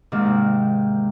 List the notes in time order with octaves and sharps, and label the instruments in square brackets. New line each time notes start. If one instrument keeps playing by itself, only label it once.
[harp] G#2 C3 D#3 A#3